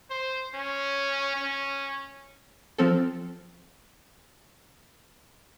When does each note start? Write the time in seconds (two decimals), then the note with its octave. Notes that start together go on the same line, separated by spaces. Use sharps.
0.10 C5
0.55 C#4
1.36 C#4
2.78 F3 C4 A4